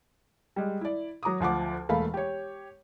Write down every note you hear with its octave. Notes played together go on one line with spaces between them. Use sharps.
G3 G#3
E4 D5
F#3 A#5 D6 D#6
D2 F3 F#5 D6
E1 A3 A#3 F5 B5
G4 C#5